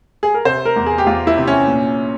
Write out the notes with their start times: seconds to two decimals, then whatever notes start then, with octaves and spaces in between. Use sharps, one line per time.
0.23 G#4
0.34 A#4
0.45 C3 C5
0.65 A#4
0.76 E2
0.86 G#4
0.98 G4
1.06 E2 F4
1.27 E4
1.38 C3
1.47 C#4
1.68 A#2